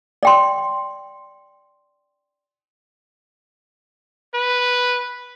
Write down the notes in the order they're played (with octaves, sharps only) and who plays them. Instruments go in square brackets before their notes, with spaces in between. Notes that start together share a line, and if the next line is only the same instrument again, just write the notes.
[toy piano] D5 G5 C6
[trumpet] B4